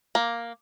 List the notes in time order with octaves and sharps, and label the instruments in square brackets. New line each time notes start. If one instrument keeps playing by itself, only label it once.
[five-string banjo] A#3